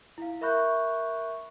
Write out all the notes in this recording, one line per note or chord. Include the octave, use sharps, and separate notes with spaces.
E4 F5
A#4 E5 B5 C#6 F#6 G6